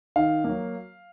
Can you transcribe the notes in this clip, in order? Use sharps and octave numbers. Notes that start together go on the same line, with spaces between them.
D#3 F5
F#3 A#3